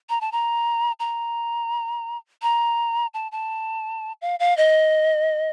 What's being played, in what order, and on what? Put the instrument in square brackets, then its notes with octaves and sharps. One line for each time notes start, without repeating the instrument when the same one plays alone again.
[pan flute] A#5
A5
A#5
A#5
A#5
A5
A5
F5
F5
D#5